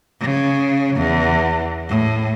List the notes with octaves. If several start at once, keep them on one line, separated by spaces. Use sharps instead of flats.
C#3
E2
A2